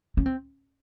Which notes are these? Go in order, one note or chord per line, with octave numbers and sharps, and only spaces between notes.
C#4
C4